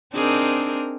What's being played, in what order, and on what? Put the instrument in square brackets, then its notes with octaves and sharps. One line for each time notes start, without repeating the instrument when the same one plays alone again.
[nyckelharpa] C4 D4 [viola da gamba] D#4 G#4 A#4